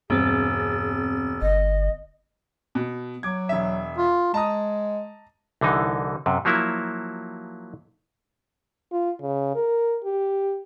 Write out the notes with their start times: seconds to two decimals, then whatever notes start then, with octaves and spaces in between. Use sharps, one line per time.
0.10 E1 G2 C4 G#4 A6
1.42 G1 D#5
2.75 B2
3.23 F#3 D6 G#6
3.49 E1 E5
3.98 F4
4.34 G#3 A5 A#5 D#6
5.61 C2 D3 E3 D#4
6.26 F#2 C3
6.45 F3 F#3 A#3 E4
8.92 F4
9.21 C#3
9.55 A#4
10.04 G4